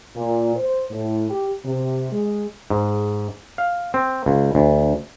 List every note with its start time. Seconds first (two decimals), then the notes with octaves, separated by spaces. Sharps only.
0.16 A#2
0.56 C5
0.90 A2
1.29 G4
1.64 C3
2.12 G#3
2.70 G#2
3.58 F5
3.94 C4
4.26 C#2
4.55 D2